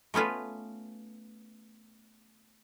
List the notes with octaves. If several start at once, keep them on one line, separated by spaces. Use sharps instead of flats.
A3 B3 C#4 F4 B4